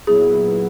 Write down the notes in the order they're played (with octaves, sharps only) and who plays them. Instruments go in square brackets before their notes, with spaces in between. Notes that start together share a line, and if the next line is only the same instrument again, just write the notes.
[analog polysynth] A#2 F#3 B3 E4 [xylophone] G#4